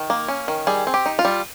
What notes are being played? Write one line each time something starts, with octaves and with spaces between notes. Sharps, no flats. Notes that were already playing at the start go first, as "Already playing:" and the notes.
Already playing: D#3
A#3
C#4
D#3
G3 G#4
C4
G4
D#4
F4
G3